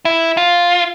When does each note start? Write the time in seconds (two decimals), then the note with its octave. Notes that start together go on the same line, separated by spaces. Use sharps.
0.05 E4
0.37 F4